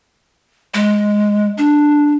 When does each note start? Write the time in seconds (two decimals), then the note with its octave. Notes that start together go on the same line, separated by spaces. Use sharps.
0.74 G#3
1.58 D4